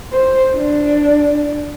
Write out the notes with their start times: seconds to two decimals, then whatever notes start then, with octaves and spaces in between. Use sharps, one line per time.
0.12 C5
0.56 D4